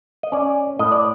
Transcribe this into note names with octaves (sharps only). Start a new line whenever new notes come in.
D#5
C#4 D5
A2 D#5
D5